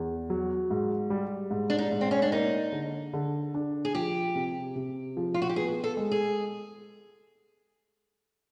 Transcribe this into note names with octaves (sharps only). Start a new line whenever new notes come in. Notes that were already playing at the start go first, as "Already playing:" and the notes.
Already playing: E2
F#3
G#2
G3
G#2
D4
D#4
G#2
C4
C#4
D4
A#3 D#4
D3
D3
D4
G#4
F3 G4
C3
C3
F3
F4
F#4
G4
B3 G#4
A4
G#3
G#4